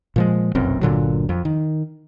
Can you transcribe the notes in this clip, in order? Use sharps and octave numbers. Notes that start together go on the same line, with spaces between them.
A#2 F3 G#3
F1 B1 F#2 C4
G1 A#2 D3 F#3
F2
D#3